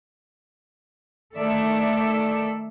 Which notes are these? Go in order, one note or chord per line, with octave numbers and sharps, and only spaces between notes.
D#3 A3 A4 D5 E5